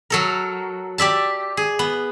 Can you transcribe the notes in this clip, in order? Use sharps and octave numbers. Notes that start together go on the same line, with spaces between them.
F#3 A4 A#4
G4 D5 E5 A5
G#4
B3